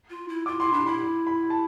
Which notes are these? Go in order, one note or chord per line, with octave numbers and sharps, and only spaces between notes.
F4
E4
F4 D6
E4 C6
D4 B5
E4 B5
B5
A5